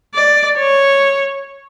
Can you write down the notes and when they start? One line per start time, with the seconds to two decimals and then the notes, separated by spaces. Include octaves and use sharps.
0.14 D5
0.58 C#5